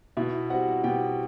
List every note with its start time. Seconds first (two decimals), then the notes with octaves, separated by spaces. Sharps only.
0.17 B2 E4 E5
0.50 G3 C4 F#4 F#5
0.84 B2 G4 G5